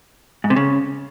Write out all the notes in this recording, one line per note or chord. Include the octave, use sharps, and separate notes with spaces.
G#2
C3
C#3